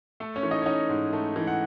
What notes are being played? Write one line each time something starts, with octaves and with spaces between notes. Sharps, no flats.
A3 A4
C#4 C#5
E3
D#4 D#5
C#5
C#4 D#4 D#5
G#2
A3
E3
F#5